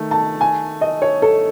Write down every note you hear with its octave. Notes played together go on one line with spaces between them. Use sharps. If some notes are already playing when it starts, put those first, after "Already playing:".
Already playing: D#3 A3
A5
G#5
D#5
C#5
A4